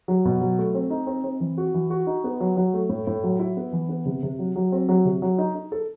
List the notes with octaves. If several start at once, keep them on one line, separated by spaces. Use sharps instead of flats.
F#3
B2
F#3
A3
C4
D#4
C4
C4
E3
F#4
E3
F#4
D#4
B3
F#3
F#3
A3
A2
A2
F#3
E4
B3
E3
B3
C3
C3
F#3
F#3
C4
F#3
C3
F#3
D#4
D#4
A4